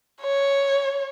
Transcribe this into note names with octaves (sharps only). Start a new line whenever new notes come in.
C#5